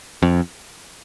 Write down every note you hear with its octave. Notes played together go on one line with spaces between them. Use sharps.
F2